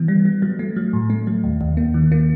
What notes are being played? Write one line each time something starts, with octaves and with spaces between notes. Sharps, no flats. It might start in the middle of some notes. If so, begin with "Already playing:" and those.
Already playing: E3 B3
G3
G3
F#3
A3
F#3
A2
A3
F#3
D#2
D#2
A#3
D#3
A#3